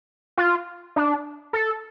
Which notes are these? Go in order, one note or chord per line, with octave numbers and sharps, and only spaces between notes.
F4
D4
A4